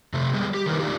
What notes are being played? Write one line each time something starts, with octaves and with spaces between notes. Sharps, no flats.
C3 A3
G3 G#3 B3
G4
D#3 E3 G3 D#4 A#4 B4
A3 D4 D#4 F4 G4